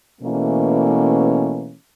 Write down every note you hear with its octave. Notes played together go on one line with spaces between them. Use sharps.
B2 E3 A3 A#3 C#4